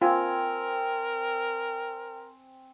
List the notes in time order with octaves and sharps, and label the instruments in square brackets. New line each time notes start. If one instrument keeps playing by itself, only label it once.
[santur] C4 G#5 [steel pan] F4 [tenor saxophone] A#4 [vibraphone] G5